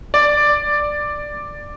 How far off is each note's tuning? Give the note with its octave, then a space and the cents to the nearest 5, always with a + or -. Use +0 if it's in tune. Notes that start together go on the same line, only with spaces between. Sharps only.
D5 +5